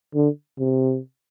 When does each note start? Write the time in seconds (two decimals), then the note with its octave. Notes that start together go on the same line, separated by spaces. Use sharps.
0.15 D3
0.59 C3